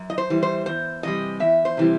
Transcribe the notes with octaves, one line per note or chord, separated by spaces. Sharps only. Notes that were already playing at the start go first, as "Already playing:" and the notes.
Already playing: F#2
D#5
C5
E3 G3
C5
E2 C5
C3 E3 G3 D#5
E2 E5
C5
C3 E3 G3